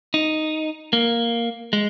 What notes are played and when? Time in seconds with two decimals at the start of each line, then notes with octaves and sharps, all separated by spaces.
0.14 D#4
0.93 A#3
1.73 G#3